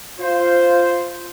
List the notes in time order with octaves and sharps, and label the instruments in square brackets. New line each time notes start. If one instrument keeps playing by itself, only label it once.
[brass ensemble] F4 C5